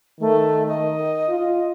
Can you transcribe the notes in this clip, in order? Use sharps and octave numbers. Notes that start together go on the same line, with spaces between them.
D#3 A3
D#5
F4